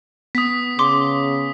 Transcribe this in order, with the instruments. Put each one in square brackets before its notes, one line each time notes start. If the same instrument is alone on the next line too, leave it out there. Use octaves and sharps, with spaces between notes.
[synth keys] B3 [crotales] D#6 B6
[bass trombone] C#3 [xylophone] C6 D6